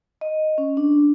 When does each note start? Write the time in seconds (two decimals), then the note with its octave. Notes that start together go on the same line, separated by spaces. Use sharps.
0.21 D#5
0.58 C#4
0.77 D4